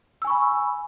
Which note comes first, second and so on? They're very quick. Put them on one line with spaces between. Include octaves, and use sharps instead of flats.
E6 G#5 C#6 B5